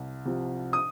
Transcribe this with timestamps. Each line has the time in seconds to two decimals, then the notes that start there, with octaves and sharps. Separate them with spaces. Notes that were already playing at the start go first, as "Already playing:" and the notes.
Already playing: C2
0.25 C3 F3
0.73 D#6